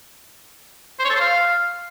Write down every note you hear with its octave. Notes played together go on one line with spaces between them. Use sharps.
C5
C#5
A4
C5
F5